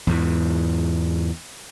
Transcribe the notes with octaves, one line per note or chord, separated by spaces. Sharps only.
E2 G#2 E3